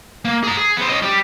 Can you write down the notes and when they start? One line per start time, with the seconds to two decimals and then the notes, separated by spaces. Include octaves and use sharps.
0.25 A#3
0.44 G#4 A#5
0.57 G#4
0.77 B3 C5
0.89 C#4 D#5
1.02 G3 G4